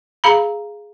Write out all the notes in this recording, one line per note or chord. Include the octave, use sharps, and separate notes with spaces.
G#4 F5 A#5 B5